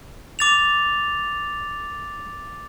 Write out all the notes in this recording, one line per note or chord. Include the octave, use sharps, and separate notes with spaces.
D6 A6 F7